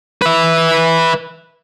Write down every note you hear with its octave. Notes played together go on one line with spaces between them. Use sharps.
B4 E5